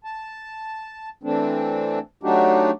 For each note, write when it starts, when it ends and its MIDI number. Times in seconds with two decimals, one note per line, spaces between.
0.04 1.09 81
1.23 1.99 52
1.23 1.99 57
1.23 1.99 60
1.23 1.99 62
2.23 2.71 54
2.23 2.71 57
2.23 2.71 62
2.23 2.71 63
2.23 2.71 66
2.23 2.71 67